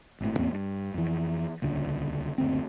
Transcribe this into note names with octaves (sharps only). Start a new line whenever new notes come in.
G#1 A2
A1 E2 A#3 C4
G2
F2 E3
D#1 C#2 D3
F#1 D2 C4